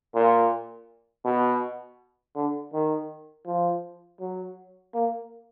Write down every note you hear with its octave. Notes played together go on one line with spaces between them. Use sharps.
A#2
B2
D3
D#3
F3
F#3
A#3